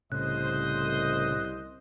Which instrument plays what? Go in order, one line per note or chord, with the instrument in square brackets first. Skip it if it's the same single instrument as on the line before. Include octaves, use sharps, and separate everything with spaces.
[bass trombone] C2 [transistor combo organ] A2 C#3 [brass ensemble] C5 D#5 [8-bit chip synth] F#6